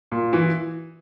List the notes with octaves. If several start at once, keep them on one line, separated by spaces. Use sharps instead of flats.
A#2
E3